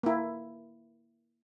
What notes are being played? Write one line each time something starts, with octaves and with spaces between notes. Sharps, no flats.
A#3 E4